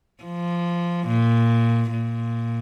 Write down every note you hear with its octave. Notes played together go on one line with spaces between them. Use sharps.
F3
A#2
A#2